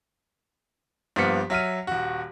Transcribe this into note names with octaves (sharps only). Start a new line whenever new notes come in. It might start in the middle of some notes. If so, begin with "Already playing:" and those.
G2 F3 A#3 B3 B6 C#7
F#3 E5 F6 D#7
D#1 F#4